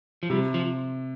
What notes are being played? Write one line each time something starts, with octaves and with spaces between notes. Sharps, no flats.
F3
C3 G3
F3